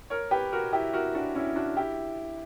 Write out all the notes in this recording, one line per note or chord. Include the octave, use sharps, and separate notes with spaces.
A#4 C#5
G4 B4
F#4 A#4
E4 G4
F#4 A#4
D4 F#4
C#4 E4
D4 F#4
E4 G4